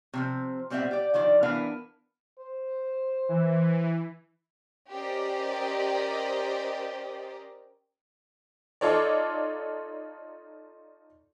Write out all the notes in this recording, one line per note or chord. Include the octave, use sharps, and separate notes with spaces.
C3 F3 C4
A#2 G3 C4 D#4 E5 F#5
G4 D5
D3 D#3 F3 D5
E3 B3 D4 E4 A#4 F5
C5
E3
C#4 G4 A#4 C5 D5 D#5
D#4 F4 A4 C#5 D5